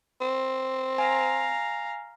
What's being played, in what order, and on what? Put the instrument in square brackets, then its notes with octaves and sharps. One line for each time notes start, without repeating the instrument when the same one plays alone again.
[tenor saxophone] C4
[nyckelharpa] F5 A#5 [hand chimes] G#5